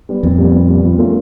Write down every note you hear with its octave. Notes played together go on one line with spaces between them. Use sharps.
G3 B3
F2 A#2
G3
B3
A#2
G3 B3
F2 F3
A3 C#4 F4 A#4